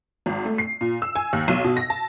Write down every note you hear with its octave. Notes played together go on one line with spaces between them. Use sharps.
G#1
A3
C7
A#2
E6
G#5
D#2
B1
B2
A#6
A5